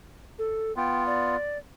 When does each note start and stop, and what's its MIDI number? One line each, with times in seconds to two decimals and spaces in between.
0.39 0.75 69
0.77 1.36 59
0.77 1.36 65
0.77 1.06 79
1.06 1.58 74